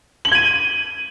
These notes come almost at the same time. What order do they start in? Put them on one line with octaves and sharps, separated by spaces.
F#7 G7 G#6 D#7